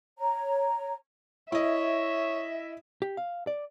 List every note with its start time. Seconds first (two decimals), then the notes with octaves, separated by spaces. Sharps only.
0.19 C#5 A#5
1.52 E4 C#5 D#5 E5
3.02 G4
3.17 F5
3.47 D5